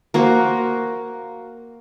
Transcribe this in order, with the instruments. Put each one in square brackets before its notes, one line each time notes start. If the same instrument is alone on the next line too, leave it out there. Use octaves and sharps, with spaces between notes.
[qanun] A#3 F#4 A#4 C5